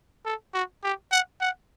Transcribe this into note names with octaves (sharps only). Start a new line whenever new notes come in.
A4
F#4
G4
F#5
F#5